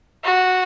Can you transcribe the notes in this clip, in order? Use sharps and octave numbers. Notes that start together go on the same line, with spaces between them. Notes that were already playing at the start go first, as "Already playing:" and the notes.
F#4